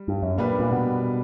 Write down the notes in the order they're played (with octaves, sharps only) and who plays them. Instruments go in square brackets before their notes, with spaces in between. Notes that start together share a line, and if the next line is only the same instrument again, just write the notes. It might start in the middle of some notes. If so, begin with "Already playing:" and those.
Already playing: [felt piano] G3
[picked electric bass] G2
F#2
[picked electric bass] A#2 [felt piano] G3 A#3 D4 G4 B4
[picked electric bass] A#2
B2